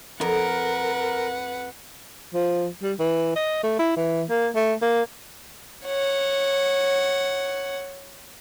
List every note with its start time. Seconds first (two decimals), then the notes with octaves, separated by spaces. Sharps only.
0.21 F2 A#4 B4 F#5
2.34 F3
2.83 G3
2.99 E3
3.36 D#5
3.63 A3
3.79 E4
3.96 E3
4.30 A#3
4.55 A3
4.82 A#3
5.86 C#5 F#5